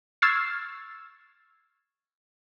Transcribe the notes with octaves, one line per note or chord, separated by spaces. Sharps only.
C#6 E6 F6 G#6 A6 C7